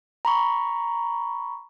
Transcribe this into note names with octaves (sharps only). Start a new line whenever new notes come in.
A#5 B5 C#6